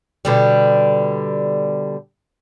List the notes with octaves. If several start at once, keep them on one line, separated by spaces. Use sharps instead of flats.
B2 D3 G3